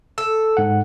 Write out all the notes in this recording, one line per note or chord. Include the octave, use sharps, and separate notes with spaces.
A4 E6
G#2 F#5